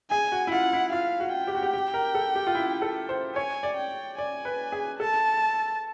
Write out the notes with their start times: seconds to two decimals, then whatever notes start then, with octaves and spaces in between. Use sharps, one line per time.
0.11 G#4 G#5
0.32 F#4
0.47 E4
0.52 F4 F#5
0.73 E4
0.92 F4 F5
1.20 F#4
1.33 G5
1.47 G4
1.55 F#4
1.63 G4
1.73 G4
1.94 A#4
2.15 A4
2.35 G4
2.47 F4
2.55 E4
2.82 A4
3.09 C5
3.36 C#5 G#5
3.63 D5
3.77 G5
4.18 D5 G#5
4.45 B4
4.72 G#4
5.00 A4 A5